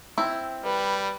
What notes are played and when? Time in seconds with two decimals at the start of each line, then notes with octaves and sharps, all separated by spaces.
0.18 C4 E4
0.64 G3 B4